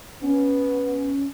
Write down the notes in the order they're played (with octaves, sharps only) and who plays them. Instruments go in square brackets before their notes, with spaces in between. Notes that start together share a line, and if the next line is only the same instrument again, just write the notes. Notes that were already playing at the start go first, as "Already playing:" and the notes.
[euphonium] B3 [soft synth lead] C#4